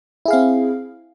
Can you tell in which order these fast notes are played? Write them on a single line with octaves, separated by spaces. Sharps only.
E4 G#4 F5 C4